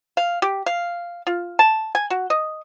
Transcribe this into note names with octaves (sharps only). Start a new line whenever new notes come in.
F5
G4
F5
F4
A5
G#5
F#4
D#5